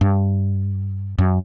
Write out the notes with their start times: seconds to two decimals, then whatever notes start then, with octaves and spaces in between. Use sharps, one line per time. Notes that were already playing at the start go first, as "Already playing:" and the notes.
0.01 G2
1.18 F#2